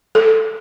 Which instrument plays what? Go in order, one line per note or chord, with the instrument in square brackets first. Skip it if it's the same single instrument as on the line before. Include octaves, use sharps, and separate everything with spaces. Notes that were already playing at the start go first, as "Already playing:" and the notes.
[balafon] A4